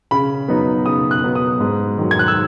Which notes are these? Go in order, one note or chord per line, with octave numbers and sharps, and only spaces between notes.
C#3 B5
F#3 B3 D#4
C#3 D#6
F#6
F#3 B3 D#4
D#6
G#2
D#3 F#3
G#6
F#6
E6